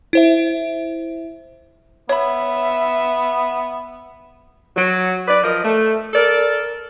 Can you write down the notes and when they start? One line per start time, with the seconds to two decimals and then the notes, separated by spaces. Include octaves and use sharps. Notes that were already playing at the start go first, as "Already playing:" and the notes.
0.13 E4 C5 E5
2.09 B3 C#5 E5 B5
4.76 F#3
5.26 B4 D5
5.42 F3 A#4 D#5
5.64 A3
6.13 A4 A#4 D5